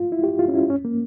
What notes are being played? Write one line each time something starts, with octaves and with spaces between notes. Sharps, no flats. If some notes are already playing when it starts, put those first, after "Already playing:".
Already playing: F4
E4
G4
F4
C#4
E4
C#4
A#3